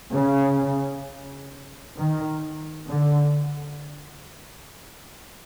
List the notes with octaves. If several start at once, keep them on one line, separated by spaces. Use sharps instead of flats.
C#3
D#3
D3